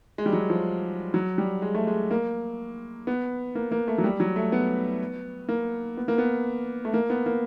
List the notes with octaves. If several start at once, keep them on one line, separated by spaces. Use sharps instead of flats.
G#3
G3
F#3
F3
F#3
G3
G#3
A3
G#3
A#3
B3
A#3
A#3
A3
F#3
G3
F#3
A3
B3
A#3
B3
A#3
B3
A3
A#3
B3
A#3